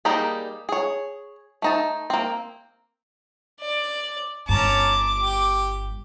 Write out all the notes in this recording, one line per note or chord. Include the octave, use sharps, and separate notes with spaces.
G3 A#3 D#4 G4 G#4
G#4 C#5
A3 D#4 A5
A#3 C4
D5
G1 G2 C#4 A5 A#5 D6
G4